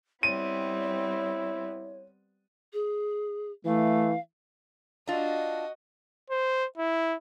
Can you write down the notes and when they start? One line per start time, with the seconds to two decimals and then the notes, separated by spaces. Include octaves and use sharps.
0.23 G3 B3 C4 E4 C#5 D#7
2.73 G#4
3.65 E3 A3 F5
5.07 D4 F4 F#4 D#5
6.30 C5
6.78 E4